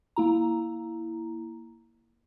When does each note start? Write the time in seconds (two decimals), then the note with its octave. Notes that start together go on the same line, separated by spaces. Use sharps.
0.16 A#3 E4 A#5